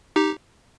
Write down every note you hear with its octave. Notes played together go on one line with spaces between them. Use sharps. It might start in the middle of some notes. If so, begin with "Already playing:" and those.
D#4 G4